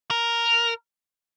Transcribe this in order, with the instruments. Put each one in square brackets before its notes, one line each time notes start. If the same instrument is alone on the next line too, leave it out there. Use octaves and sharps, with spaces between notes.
[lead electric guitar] A#4